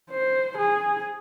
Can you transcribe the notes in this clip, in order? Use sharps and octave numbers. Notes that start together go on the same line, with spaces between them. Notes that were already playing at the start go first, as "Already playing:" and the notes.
C5
G#4